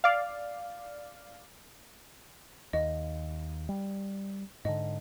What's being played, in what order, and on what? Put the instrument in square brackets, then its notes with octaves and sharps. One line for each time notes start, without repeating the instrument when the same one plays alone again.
[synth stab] D5 F5
[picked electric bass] D#2 [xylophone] D#5
[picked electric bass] G3
[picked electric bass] G#2 D3 [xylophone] D#5